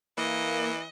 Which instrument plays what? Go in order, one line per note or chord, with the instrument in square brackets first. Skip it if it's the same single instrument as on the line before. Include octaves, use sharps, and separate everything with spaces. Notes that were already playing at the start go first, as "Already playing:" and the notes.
[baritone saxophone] E3 [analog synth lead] A#3 [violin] D#5